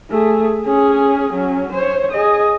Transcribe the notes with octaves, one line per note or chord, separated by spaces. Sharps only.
A3 G#4
C#4 G#4
F#3 C#4
C5 C#5
G#4 D#5